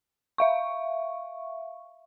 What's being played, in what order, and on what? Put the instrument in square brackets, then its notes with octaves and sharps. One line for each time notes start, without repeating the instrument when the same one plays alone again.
[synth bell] E5 F5 C#6